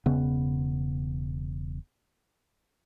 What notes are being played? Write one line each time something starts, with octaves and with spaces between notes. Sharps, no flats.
E1 C#3 B3